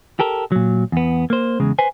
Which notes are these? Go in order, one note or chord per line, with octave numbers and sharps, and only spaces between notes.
G4 A4 A#4
A#2 F#3
E2 B3
A#3 C5
E2 C#3 G#3
B4 C5 G#5